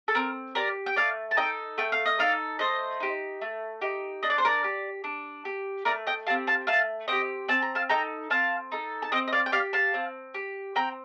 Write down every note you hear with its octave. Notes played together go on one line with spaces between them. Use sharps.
A4
C4 A#4
G4 A#4 D5
G5
A3 D5 F5
A5
D#4 A4 D#5 G5
A3 G5
F5
D#5
D#4 A4 D5 F5
A3 C5 D#5
D#4 G4
A3
D#4 G4
D4 D#5
D5
C5
A#4 D5
G4
D4
G4
A3 A#4 D5
D#5 G5
C4 G4 F5 A5
F5 A5
A3 F5 A5
C4 G4 D#5 G5
C4 A5
A#5
F5 A5
D#4 A4 G5 A#5
C4 F5 A5
D#4 A4
A5
C4 D#5 G5
D#5
D5 F5
G5
G4 D5 F5
F5 A5
C4
G4
C4 G5 A#5